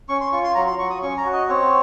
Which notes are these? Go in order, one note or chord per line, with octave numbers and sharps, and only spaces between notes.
C#4 C#6
C6
F4 C#6
C6
F#3 A#5
C6
F#3 C#6
D#6
C#4 C#6
A#5
F#4
D#5
C4 C#5